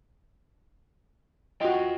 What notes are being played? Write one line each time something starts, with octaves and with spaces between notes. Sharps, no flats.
F4 F#4 D#5 G5